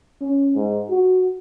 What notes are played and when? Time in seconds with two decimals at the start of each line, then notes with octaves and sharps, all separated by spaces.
0.21 C#4
0.55 G#2
0.90 F#4